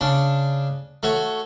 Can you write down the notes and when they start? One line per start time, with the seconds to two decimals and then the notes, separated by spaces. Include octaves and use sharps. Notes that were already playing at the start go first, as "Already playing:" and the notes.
0.01 C#3 D4
1.03 A3 F#4 C#5